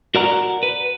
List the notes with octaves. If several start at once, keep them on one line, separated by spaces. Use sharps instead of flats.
F#4 A#4 D5 F#5 A#5
B4